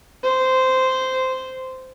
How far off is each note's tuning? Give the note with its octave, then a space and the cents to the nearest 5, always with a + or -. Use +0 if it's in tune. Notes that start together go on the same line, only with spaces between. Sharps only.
C5 -10